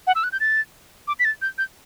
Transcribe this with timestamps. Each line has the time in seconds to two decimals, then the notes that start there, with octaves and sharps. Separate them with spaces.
0.07 F#5
0.15 E6
0.24 F#6
0.32 G6
0.40 A6
1.08 D6
1.19 B6
1.25 A6
1.42 G6
1.58 G6